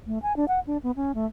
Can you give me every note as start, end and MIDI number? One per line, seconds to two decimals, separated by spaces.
0.07 0.18 57
0.23 0.35 80
0.36 0.45 62
0.48 0.60 78
0.67 0.77 62
0.83 0.91 59
0.96 1.12 61
1.15 1.26 57